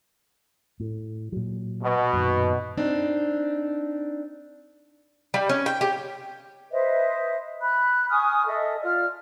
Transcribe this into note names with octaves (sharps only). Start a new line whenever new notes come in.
A2
A#2 F#3
B2
F#2 A#2 D#3
C4 D4 D#4
G3
C#4
G5
G4
B4 C5 D#5 E5
B5 F#6
G#5 C#6 D#6 F6
A4 D#5 E5
F4 D5 F6